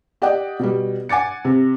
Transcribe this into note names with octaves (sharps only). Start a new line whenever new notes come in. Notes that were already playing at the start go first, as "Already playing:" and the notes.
G4 D5 D#5 F#5 G5
B2 G3
F#5 G#5 D6 A6 C#7
C3